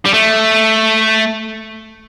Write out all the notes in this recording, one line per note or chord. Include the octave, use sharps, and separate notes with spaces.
G3
A3